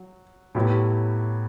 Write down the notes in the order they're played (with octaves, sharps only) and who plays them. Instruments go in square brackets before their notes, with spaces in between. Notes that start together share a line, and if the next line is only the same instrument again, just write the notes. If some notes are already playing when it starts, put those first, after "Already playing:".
Already playing: [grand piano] F#3
A2 F#3 B3 E4 G4